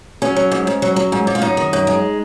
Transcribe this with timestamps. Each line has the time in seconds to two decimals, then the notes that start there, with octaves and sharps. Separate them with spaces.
0.22 F#3 C#4
0.36 F#3
0.52 G#2
0.67 G#2
0.82 F#3
0.96 F#3
1.12 G#2
1.27 G#2
1.35 F4
1.42 F#2 D#4
1.57 D#3
1.73 F#2
1.87 G#3